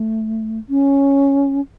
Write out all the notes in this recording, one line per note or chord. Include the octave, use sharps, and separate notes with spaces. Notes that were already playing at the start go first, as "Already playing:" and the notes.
Already playing: A3
C#4